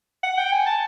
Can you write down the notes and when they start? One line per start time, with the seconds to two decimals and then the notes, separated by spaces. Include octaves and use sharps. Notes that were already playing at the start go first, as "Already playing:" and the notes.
0.23 F#5
0.38 G5
0.52 G#5
0.66 A5